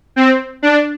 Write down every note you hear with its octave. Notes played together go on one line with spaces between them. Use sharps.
C4
D4